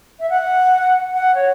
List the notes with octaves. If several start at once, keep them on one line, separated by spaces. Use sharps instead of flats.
E5
F#5
F#5
C#5